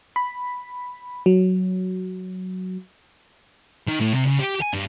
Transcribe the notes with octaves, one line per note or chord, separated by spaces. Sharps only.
B5
F#3
D#3
A2
C3
C#3
G4
G#5
G2